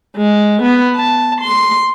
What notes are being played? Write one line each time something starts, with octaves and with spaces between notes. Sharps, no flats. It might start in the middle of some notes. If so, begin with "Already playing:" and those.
G#3
B3
A5
C6